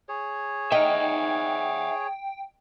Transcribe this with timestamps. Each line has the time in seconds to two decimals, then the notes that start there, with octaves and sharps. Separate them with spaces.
0.09 G#4 C#5
0.72 D#4 E5 F#5 G5